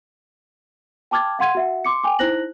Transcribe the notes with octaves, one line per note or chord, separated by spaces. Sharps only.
G5 A5 D6 F6 G#6 A6
F5 F#5 C6 G#6 D#7
F#4 E5 F#5
C6 D6 C#7
G5 G#5 D6
D#4 E4 C5 F#6 A#6 F#7